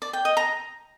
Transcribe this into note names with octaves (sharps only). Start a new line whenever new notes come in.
D5
G5
D#5
A#5